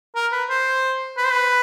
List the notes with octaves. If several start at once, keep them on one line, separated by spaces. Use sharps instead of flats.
A#4
B4
C5
B4
C5
B4